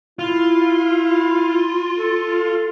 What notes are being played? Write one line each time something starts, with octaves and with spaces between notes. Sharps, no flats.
E4 F4
A4